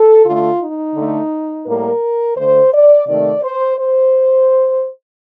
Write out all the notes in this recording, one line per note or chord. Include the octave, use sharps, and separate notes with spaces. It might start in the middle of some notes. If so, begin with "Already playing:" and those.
Already playing: A4
D3 A3 F4
D#4
D3 A3
A2 G3 A#3 A#4
D3 A3 C5
D5
C3 D#3 A3 D5
C5
C5